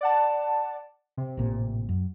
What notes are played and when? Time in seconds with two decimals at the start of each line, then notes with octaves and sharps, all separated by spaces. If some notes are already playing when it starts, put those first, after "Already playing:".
0.01 D5 F#5 A5
1.17 C3
1.37 A1 A#2
1.89 F#2